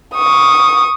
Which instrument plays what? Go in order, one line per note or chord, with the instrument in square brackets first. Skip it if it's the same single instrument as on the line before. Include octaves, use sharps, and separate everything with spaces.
[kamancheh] C#6 D#6